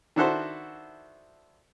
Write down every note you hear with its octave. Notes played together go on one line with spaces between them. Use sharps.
D#3 D4 E4 F#4 A4 C5